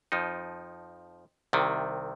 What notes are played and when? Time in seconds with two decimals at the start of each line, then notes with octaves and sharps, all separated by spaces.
0.12 F2 F3 D#4
1.53 C2 C3 D#3